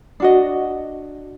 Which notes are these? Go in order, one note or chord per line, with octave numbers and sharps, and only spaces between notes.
D4 F#4 D#5